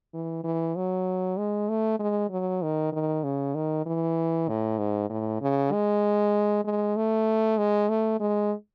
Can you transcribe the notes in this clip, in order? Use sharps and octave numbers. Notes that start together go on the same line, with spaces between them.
E3
E3
F#3
G#3
A3
G#3
F#3
D#3
D#3
C#3
D#3
E3
A2
G#2
A2
C#3
G#3
G#3
A3
G#3
A3
G#3